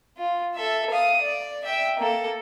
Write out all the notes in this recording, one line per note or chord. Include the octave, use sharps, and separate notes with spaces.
F4
A4 E5
F5 D#6
D5
E5 G5
A#3 A4